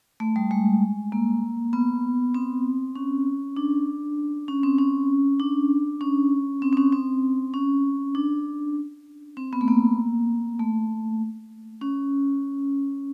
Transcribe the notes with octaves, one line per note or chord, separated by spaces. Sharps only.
A3
G3
G#3
A#3
B3
C4
C#4
D4
C#4
C4
C#4
D4
C#4
C4
C4
C#4
C4
C#4
D4
C4
B3
A3
A#3
A3
C#4